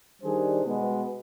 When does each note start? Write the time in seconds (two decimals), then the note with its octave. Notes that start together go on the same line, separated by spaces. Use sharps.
0.22 D#3 G3 D4 G#4 C5
0.63 B2 G#3 B3